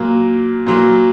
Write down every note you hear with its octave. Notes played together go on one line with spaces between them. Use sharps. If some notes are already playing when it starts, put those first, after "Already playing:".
Already playing: A#2 F#3 A#3
A#2 F#3 A#3